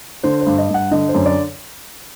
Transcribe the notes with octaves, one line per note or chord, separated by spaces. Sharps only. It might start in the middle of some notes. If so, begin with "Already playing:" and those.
D3 C5
C5
G2
D#5
G2 F#5
D3 D#5
C5
F#2
D5